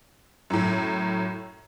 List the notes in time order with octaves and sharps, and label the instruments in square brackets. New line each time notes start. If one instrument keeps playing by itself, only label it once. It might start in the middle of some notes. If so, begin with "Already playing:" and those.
[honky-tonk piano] F#2 A2